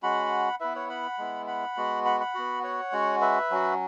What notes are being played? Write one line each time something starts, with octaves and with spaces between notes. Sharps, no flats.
G#3 C#4 F#4 F#5 B5
B3 E4 B4 E5
C#5 F#5
F#5 B5
G#3 B3 E4
F#5 B5
G#3 B3 F#4
F#5 B5
F#5 B5
B3 F#4
C#5 F#5
G#3 C#4 F#4
B4 E5
F#3 C#4 F#4